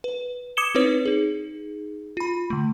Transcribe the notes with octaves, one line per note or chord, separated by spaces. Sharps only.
B4
D6 D#6 G#6 C#7 E7 G7
C4 D#4 E4 B4 C#5
D#4 G#4
F4 B5
D3 A3